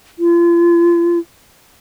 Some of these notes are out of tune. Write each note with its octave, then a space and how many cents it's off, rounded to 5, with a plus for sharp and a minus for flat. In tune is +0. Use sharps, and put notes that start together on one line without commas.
F4 -35